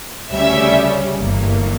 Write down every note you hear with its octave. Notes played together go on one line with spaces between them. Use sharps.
D2 C#3 G3 C#4 E5
G1 G2 E3 A#3